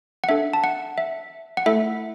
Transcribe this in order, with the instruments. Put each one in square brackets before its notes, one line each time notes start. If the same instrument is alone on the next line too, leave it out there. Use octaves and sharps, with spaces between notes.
[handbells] F#5
D4 A4 E5
A5
F#5
E5
F#5
A3 E4 A4 E5